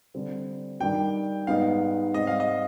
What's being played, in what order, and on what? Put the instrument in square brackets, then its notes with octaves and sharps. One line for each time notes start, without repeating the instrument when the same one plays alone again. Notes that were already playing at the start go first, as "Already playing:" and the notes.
[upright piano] D3 G3 C4
[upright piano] G2 D#3 G3 [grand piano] G5
[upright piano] G#2 G3 B3 D#4 [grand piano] F5
[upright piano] G#2 G3 C4 [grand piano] D#5
[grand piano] F5
D#5